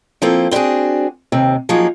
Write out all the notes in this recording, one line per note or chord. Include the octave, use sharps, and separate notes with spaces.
F3 A#3 C4 E4 A4
C4 D4 E4 F#4 G#4
D#2 C3 C4
F3 F#3 A#3 D#4 G#4